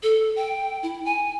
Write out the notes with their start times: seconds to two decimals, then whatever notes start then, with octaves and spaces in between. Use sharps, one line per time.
0.03 A4
0.36 G5
0.83 E4
1.05 G#5